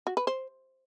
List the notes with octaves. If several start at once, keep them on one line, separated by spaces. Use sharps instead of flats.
F#4
B4
C5